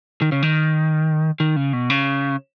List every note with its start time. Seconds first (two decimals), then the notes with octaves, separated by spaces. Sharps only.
0.22 D#3
0.32 C#3
0.43 D#3
1.40 D#3
1.56 C#3
1.73 B2
1.90 C#3